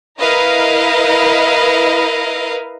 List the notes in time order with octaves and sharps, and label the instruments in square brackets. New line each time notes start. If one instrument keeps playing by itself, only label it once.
[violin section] E4 A#4 B4 D#5 F5